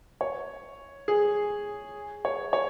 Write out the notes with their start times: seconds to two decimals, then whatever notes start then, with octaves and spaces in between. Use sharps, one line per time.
0.21 C#5
1.08 G#4
2.25 C#5
2.53 C#5